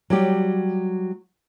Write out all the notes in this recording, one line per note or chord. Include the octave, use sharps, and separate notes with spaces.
F#3 G3 G4